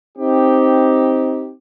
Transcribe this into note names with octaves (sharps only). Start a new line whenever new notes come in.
C4 D#4 G4